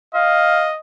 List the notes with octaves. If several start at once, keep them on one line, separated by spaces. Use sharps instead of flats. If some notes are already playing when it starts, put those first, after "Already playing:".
D#5 F5